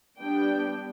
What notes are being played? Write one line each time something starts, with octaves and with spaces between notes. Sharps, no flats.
G3 B3 D4 G5